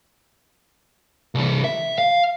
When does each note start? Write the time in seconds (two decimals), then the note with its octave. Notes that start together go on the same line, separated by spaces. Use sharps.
1.35 C2 E3
1.64 E5
1.98 F5